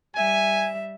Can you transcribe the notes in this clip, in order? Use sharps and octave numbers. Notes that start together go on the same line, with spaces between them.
G3 E5 G#5